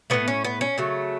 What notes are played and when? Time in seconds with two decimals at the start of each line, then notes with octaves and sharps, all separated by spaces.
0.10 A2 E3 A3 B3
0.28 C#4
0.44 B3
0.61 C#4
0.78 C#3 F#3 A3